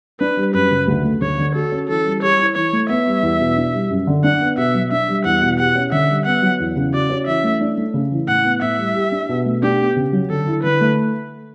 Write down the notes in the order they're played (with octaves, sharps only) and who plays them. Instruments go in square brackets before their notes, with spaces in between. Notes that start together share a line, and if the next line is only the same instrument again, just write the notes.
[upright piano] D4 [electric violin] B4
[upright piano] G3
[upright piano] F#2 [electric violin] B4
[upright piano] C#3
D2
A3
[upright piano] D2 [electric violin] C#5
[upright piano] D3
[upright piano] F#4 [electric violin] A4
[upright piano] C#4
[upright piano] E3 [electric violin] A4
[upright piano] G3
[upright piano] G4 [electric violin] C#5
[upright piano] E4
[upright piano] E3 [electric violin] C#5
[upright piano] A3
[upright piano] B3 [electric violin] E5
[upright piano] G3
E2
B2
D4
G3
F#2
D3
[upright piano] D4 [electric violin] F#5
[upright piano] B3
[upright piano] B2 [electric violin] E5
[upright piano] F#3
[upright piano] D4 [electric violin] E5
[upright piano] G3
[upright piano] E2 [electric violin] F#5
[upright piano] B2
[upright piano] G4 [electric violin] F#5
[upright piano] C#4
[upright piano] D3 [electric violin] E5
[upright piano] G3
[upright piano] B3 [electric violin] F#5
[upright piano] F#3
E2
C#3
[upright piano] F#4 [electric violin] D5
[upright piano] C#4
[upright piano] E3 [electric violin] E5
[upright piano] A3
D4
A3
C#3
E3
[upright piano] A2 [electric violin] F#5
[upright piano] B3
[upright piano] A2 [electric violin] E5
[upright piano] G3
G4
D4
B2
A3
[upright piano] D4 [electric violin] G4
[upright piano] B3
C#3
F#3
[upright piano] D3 [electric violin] A4
[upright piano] E4
[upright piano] D3 [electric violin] B4
[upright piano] A3